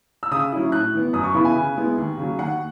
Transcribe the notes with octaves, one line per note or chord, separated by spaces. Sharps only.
E6
C#3 D#6
F#3 C#4 E4
A2 F#6
E3 B3
F#2 D#6
C#6
C#3 E3 B3 E4 B5
G#5
C#3
G#3 B3 E4
D#2
C#3 F#3
D#2 F#5